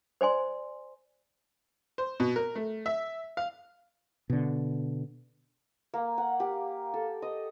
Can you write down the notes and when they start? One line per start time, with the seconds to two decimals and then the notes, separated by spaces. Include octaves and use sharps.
0.21 C5 D5 G#5 C6
1.98 C5
2.20 B2
2.36 A#4
2.55 A3
2.86 E5
3.37 F5
4.30 B2 D3
5.94 A#3
6.18 F#5
6.40 G4
6.94 A4
7.22 D#5